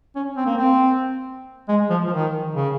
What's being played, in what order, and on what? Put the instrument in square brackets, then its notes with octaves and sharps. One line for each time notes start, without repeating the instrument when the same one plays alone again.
[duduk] C#4
C4
A#3
C4
G#3
F3
F3
D#3
C#3